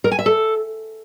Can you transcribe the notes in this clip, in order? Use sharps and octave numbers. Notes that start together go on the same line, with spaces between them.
A#4
G#5
E5
A4